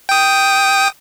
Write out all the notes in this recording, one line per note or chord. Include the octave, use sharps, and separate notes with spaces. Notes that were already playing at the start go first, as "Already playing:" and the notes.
G5 D#6